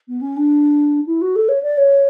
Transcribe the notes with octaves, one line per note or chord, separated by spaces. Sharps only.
B3
C#4
D4
E4
F#4
A4
C#5
D5
C#5